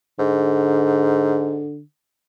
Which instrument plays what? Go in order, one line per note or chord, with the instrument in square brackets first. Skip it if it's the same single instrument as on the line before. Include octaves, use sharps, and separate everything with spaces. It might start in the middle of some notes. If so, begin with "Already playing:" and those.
[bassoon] G#2 [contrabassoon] D3